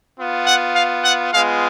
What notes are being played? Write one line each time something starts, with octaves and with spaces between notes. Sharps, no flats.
B3 F4
F#5
F5
F#5
G#3 B3 F4 F5